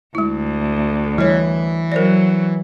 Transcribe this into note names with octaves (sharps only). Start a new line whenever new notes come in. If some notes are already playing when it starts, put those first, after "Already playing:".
D2 G#3 E4
E3 G3 C#5
F#3 A#4 C5 D5